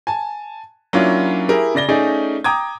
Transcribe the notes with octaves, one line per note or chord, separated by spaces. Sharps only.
G#5 A5
F#3 A#3 C#4 D4 E4 F4
E4 G4 G#4 A#4
C#3 D5 A#6 G7
A3 C#4 D#4 G#4 D5
G5 A#5 D6 D#6 G#6